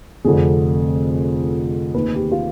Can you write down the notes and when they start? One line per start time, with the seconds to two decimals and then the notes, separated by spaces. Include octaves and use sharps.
0.25 F1 F2 D3 G#4
1.94 D#2 D#3 B4
2.15 G4
2.32 F4